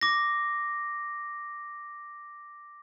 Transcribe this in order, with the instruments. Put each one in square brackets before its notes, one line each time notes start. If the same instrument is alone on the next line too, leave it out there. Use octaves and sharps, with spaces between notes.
[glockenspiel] D6 A#6